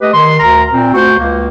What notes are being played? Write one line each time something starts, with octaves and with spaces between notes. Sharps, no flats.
A3 G4 B4 D#5
D#3 C6
D2 A#4 A#5
A#2 C4
A3 F#4 C5
C#2 A#3